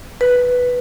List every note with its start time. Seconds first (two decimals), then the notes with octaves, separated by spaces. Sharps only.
0.21 B4